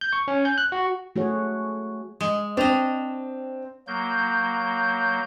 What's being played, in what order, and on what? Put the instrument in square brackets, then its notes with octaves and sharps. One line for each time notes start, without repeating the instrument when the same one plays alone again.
[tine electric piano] G6
C#6
C#4
G6
F#6
F#4
[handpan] A3 F#4 G#4 C#5
[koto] G#3
[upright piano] C4 F7 [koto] D4 D#5
[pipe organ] F#3 A#3 G6